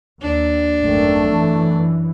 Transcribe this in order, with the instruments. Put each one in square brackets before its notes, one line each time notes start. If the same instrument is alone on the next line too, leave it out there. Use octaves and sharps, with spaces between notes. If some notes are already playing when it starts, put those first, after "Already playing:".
[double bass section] D#2 [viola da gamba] D4
[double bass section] G#1 F#2 D#3 [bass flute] A3
[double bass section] F#2 E3